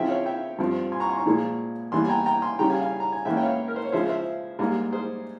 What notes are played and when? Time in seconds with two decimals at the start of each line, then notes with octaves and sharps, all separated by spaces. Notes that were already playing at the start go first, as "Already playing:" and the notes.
Already playing: C#3 F3 C4 E5 G5
0.09 C#5 F5
0.26 E5 G5
0.59 G2 F3 C4
0.92 G#5 C6
1.00 A#5 C#6
1.09 G#5 C6
1.17 A#5 C#6
1.26 A#2 F3 G#3
1.92 E2 E3 G3 A#3 G#5 C6
2.05 G#5
2.09 G5 A#5
2.26 G5 A#5
2.42 G#5 C6
2.59 C#3 G3 C#4 G5 A#5
2.70 F5 G#5
2.82 F5 G#5
3.00 A#5
3.12 G#5
3.25 G#2 E3 A#3 C#4 E5 G5
3.37 G5
3.43 C#5 F5
3.68 A#4
3.76 C5
3.85 C#5
3.92 C#3 F3 G#3 C5 E5
4.09 C5 E5
4.59 G#2 G3 A#3
4.93 G#4 C5